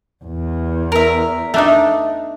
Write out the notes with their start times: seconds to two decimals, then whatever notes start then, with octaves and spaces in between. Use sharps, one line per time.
0.25 E2
0.92 A#4 E5
1.54 A3 D4 D#4